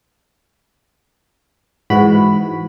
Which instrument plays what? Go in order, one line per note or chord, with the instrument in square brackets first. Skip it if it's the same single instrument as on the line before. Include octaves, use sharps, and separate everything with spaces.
[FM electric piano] G#2 E3 F#4 B5